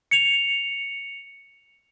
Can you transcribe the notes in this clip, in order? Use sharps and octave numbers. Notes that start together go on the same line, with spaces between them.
C#7 F7